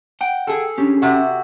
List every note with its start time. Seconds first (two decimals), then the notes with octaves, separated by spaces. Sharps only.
0.21 F#5 G5
0.47 G#4 A4
0.78 C#4 D4 G4
1.02 C3 F#4 E5